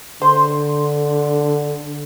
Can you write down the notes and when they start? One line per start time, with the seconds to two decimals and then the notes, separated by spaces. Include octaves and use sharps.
0.22 D3 C5